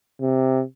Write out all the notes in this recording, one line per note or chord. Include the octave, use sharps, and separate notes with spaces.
C3